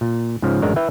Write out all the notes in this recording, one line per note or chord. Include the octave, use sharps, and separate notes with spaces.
A#2
G#2 C#3 F3
A1 F#2 G#3 D4 A#4 C#5
E4 B4 E5 G5